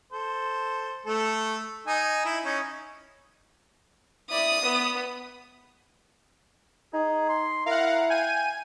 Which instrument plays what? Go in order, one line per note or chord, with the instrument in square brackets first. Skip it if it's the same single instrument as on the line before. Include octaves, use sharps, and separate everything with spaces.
[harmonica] A4 C5
A3 A4
D#4 G#5
E4
C#4 D#4
[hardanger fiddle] E4 D5 [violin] D#6
[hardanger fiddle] B3
[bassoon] D#4 [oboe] G#4
[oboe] C6
[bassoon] E4 [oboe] A#4 [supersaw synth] F5 F#5
[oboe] G5 [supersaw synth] G#5 D#7